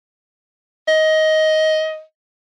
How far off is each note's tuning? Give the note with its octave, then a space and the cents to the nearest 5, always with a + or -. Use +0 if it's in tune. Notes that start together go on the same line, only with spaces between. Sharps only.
D#5 +15